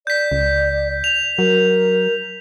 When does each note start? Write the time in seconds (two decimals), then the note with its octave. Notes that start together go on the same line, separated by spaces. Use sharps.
0.07 D5 G6 B6
0.32 C#2
1.04 F7
1.39 F#3 A#4